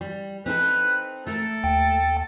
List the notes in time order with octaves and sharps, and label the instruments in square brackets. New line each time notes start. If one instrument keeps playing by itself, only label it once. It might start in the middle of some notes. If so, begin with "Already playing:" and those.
[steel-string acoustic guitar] G3
[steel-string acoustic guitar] C4 D#4 A4 [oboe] B4
[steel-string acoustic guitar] A3 A#4 [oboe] A4
[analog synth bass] D#2 [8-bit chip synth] G5